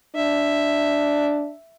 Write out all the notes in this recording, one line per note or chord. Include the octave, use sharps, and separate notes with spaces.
D4 E5